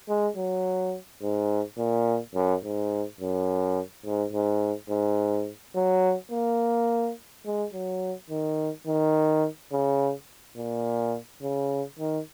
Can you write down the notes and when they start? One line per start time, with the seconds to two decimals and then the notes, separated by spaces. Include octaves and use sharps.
0.08 G#3
0.37 F#3
1.22 G#2
1.78 A#2
2.35 F#2
2.64 G#2
3.21 F#2
4.06 G#2
4.33 G#2
4.90 G#2
5.76 F#3
6.32 A#3
7.46 G#3
7.74 F#3
8.30 D#3
8.87 D#3
9.72 C#3
10.57 A#2
11.42 C#3
11.99 D#3